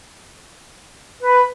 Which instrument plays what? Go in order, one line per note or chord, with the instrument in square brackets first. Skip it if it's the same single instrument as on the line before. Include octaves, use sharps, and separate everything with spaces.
[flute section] B4